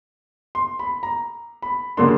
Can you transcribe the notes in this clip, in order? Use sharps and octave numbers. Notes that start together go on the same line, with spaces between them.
C6
B5
A#5
B5
C#3 F#3 A#3 D4 C6